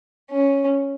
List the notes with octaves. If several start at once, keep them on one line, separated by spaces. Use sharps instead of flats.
C#4